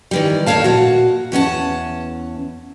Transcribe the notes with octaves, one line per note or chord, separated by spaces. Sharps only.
D#3 E3 G3
D#2 A2 D3 C#5 F5 A5
A#2 F#4
E2 C#4 F#5 A5